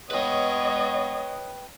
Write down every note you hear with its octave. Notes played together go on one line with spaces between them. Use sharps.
B3 B4 C#5 D#5 G5